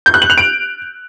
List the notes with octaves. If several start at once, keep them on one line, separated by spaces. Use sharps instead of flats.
G6
F#6
F#7
F7
D7